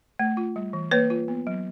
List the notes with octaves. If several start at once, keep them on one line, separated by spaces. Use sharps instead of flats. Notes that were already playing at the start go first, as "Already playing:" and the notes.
A3
F4
G3
E3
A#3 B4 C#5
F4
B3
F#3